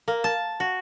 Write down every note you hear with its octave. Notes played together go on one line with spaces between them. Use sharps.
A#3
A5
F#4